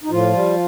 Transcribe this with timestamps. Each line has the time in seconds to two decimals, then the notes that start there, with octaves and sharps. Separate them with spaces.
0.04 D#4
0.10 A2 F3 F4
0.33 G3